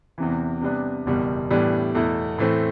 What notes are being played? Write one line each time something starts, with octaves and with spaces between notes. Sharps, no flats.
E2 C3 E3
C3 G3 B3 D4
F#1 E2 B2 G3
A2 E3 G3 B3 D4
E2 B2 A3 E4
A2 E3 A3 C4